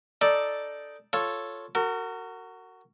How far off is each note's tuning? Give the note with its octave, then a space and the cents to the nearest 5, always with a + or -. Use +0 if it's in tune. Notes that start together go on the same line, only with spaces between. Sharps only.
D#4 +0 A4 +0 D5 +0
F4 +0 A4 +0 C#5 +0
F#4 +10 A#4 -35